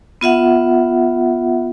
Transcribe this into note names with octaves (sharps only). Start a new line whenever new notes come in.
B3 F4 E5 F#5